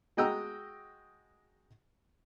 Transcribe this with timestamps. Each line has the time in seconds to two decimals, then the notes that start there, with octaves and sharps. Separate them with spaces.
0.17 G#3 F#4 D#5 G5 A#5 E6